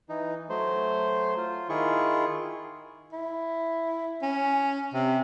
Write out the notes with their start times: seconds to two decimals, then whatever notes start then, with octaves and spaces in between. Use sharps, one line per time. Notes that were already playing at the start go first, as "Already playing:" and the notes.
0.09 E3 D#4
0.50 F#3 A3 C5
1.37 F4
1.69 D#3 E4 F4 G#4 C#6
3.13 E4
4.22 C#4
4.94 C3